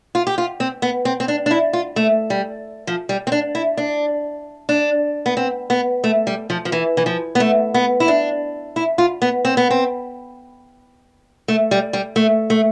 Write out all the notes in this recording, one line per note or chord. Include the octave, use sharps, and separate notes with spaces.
F4
G4
F4
C4
B3
C4
C4
D4
D4
E4
F4
A3
G3
F3
G3
C4
D4
E4
D4
D4
B3
C4
B3
A3
G3
F3
F3
E3
E3
F3
B3
A3
B3
E4
D4
E4
F4
B3
C4
B3
C4
A3
G3
G3
A3
A3